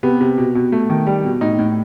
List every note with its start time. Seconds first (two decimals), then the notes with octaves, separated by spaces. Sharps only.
0.03 C3 B3
0.21 C3
0.38 B2
0.55 B2
0.72 A3
0.90 D#3
1.07 G3
1.24 B2
1.41 A2 D#4
1.59 A2